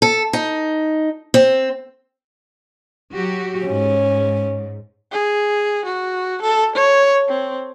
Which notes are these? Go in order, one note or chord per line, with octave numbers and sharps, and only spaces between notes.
A4
D#4
C4
F#3 F#4 G4
G#2 C#4
G#4
F#4
A4
C#5
C4